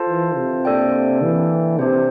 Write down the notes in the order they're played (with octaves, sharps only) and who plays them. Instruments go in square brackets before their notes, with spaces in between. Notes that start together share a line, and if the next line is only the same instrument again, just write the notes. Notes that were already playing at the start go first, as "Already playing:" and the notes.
Already playing: [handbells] F4 A4 C5 F5 A5
[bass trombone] E3
C3
[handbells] A#3 D4 A4 D5 G5
[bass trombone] E3
[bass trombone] C3 [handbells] D4 G4 C5